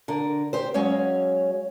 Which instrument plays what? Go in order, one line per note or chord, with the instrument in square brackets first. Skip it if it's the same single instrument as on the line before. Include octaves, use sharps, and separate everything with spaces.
[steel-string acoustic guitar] D3 A#4
G4 C5
F#3 G#3 C#4 C#5 F5